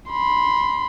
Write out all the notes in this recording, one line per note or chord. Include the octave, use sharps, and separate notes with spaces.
B5 C6